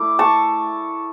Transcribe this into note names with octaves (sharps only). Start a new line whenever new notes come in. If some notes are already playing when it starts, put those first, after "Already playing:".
Already playing: A3 E4 D6
A5 C#6